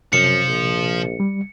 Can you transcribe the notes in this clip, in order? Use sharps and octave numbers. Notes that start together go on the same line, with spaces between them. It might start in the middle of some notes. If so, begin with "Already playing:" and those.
F#2 C3 F3 C#7
A#1
G3